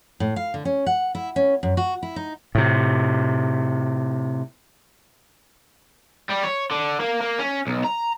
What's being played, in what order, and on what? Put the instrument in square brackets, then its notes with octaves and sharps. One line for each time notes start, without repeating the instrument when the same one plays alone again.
[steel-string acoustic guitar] A2
F5
D3
C#4
F#5
E4
C#4
F#2
F#4
E4
D#4
[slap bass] A2 C3
[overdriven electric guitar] G3
C#5
D3
A#3
A#3
C#4
B1
A#5